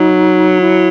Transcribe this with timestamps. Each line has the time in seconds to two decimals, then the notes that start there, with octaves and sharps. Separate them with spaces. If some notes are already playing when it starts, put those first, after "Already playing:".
Already playing: F#3 D#4
0.61 E4